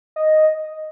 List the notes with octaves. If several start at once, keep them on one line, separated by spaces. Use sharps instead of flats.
D#5